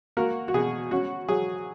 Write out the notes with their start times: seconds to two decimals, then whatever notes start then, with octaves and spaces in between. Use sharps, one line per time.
0.17 A#3 F#4 A#4
0.48 F#4
0.54 B2 G#4
0.91 C#4 F#4
1.28 F#3 G#4